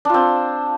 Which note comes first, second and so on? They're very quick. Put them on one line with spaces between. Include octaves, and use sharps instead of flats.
D4 F4 C4